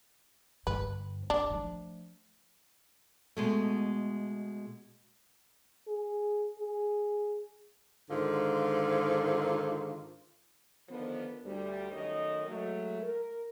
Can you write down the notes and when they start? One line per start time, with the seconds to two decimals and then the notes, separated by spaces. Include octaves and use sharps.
0.67 G2 D3 B4
1.30 C4 D4
1.50 F3 A3
3.37 B2 G#3 A3
5.88 G#4
6.59 G#4
8.10 G#2 D3 D#3 F4
10.89 D3 D#3 F3 B3
11.44 D2 G3
11.91 F#2 D#3 A3 C#5 D#5
12.48 F#3 G#3 A3
13.02 A#4